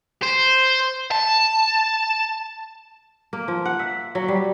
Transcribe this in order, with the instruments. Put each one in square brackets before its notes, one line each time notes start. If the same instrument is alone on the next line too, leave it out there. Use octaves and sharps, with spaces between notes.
[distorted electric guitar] C5
A5
[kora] A#3
F3
F#5
E5
F#3
G3